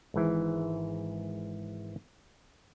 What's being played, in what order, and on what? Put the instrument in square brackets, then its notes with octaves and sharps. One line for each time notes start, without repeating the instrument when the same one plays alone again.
[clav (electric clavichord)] G#1 G#2 E3